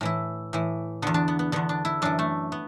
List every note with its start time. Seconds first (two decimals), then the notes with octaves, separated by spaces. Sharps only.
0.01 A2 E3 E4
0.53 A2 E3
1.02 E2 D3 B3
1.14 D4
1.28 B3
1.39 B3
1.52 E2 D3 B3
1.69 D4
1.85 E4
2.02 F#2 E3 D4
2.19 A3
2.52 B3